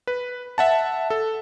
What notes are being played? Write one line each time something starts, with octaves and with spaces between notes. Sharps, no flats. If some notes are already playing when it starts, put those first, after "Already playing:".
B4
E5 F#5 A5
A4